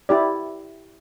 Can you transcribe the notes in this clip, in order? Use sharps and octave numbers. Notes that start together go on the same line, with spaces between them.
E4 G4 D5